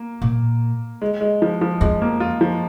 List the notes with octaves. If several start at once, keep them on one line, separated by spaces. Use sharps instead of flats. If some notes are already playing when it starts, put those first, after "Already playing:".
Already playing: A#3
A#2
G#3
G#3
F3
F3
F2 G#3
A#3
F4
F3